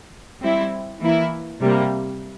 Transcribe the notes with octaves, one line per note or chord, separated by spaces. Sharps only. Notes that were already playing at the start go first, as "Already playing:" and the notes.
G3 C4 E4
E3 A#3 E4
C3 G3 A#3